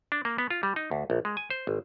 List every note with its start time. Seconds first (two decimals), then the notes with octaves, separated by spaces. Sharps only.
0.12 D4
0.25 A#3
0.38 B3
0.50 F4
0.63 G3
0.76 D#4
0.91 D2
1.10 A#1
1.25 G#3
1.37 G#5
1.50 C5
1.67 G#1